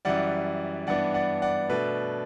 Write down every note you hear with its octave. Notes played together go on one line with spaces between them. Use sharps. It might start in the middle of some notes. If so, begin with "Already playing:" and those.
F#2 E3 G3 D5 F#5
G2 E3 B3 D4 D5 F#5
D5 F#5
D5 F#5
B2 A3 D4 B4 D5